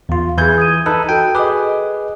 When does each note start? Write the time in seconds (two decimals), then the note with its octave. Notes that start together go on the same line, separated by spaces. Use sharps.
0.09 E2 F4
0.38 E3 E4 G#4 G6 G#6
0.58 D#6 G#6 D#7
0.86 D#4 A4 B4
1.09 F#4 A4 G5
1.35 G#4 B4 D#5 D6